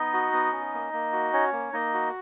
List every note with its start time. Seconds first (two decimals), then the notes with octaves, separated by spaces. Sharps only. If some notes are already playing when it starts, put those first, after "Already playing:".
Already playing: B3 D#4 D#5
0.13 F#4
0.33 B3
0.52 C#4
0.73 A#3
0.93 A#3
1.13 F#4
1.33 C#4 C#5
1.53 A#3
1.73 A#3 D#4 D#5
1.94 F#4